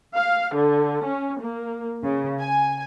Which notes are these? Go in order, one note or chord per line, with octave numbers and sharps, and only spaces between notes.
F5
D3
C#4
A#3
C#3
G#5